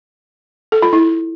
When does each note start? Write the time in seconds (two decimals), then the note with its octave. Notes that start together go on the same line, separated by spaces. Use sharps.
0.72 A4
0.82 F4
0.93 E4